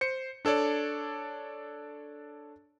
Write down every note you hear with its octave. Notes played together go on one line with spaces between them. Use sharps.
C5 C#7
D4 A4 C#5 D5